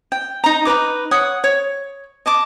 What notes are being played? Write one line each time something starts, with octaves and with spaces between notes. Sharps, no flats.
G5
D#4 A#5
D#4 A#4 B4 D6
C#5 F#5 D#6
C#5
D#5 A5 D6